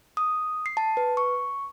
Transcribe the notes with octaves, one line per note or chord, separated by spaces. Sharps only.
D#6
C7
A5
B4
C#6